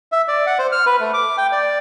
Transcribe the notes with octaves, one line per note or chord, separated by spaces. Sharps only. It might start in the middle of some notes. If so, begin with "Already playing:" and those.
E5
D5
F#5
C5
F6
B4
A3
D6
G5
D5